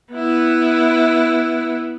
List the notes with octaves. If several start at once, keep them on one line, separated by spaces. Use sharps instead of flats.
B3 E4